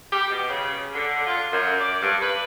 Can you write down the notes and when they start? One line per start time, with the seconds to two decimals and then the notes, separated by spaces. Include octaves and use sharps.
0.11 G4
0.30 B2
0.48 C#3
0.93 D3
1.26 F4
1.51 F#2
1.80 D5
2.01 G2
2.21 B4